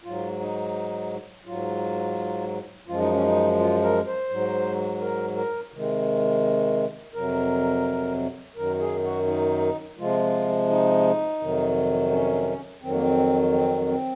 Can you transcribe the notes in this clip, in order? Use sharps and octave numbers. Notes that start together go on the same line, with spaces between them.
G#2 F#3 F4
D#4
G#2 F#3 F4
F#2 F3 G#3 F4
D#4
C#4
D#4
F4
A#4
C5
G#2 F#3
A#4
A#4
C3 D#3 G#3
F2 C3 F#3 A#4
F#2 D#3 F#3 A#4
G#4
F#4
D#4
C3 F3 G#3 F4
D#4
F2 C3 D#3 F#3
C#4
F2 D#3 F#3 C4
A#3
C4
C4
C4